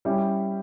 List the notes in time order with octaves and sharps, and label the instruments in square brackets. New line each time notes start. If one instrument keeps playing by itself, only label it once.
[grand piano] G3 C#4 E4 G4